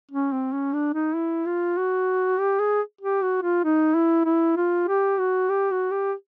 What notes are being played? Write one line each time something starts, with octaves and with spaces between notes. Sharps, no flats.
C#4
C4
C#4
D4
D#4
E4
F4
F#4
G4
G#4
G4
F#4
F4
D#4
E4
E4
F4
G4
F#4
G4
F#4
G4